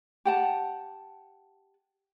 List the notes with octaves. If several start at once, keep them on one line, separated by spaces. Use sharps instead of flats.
G4 F#5 A5